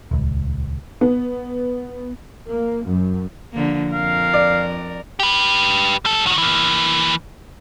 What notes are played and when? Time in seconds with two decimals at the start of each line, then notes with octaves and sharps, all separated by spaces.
0.11 D#1 C#2
1.01 B3
2.49 A#3
2.85 F#2
3.53 D3 F3 A#3
3.93 F2 A#4 F5
4.34 D5
5.20 G4 B4
6.05 G3 A4
6.26 D#3 F#4
6.38 E3 A#3